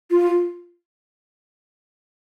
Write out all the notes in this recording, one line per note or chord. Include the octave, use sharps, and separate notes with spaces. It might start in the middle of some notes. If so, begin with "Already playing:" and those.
F4